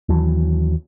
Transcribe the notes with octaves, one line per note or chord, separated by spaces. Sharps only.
D#2 E3 F#3